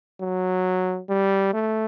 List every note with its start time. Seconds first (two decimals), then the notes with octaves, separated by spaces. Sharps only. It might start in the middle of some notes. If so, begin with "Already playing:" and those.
0.21 F#3
1.09 G3
1.53 A3